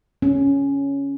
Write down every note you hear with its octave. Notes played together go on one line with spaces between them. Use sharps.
C#4